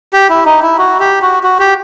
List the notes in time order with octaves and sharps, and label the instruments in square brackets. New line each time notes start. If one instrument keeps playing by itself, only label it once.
[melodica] G4
E4
D#4
E4
F#4
G4
F#4
F#4
G4